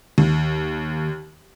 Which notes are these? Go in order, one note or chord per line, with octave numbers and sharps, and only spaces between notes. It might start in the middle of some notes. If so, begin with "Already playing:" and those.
D#2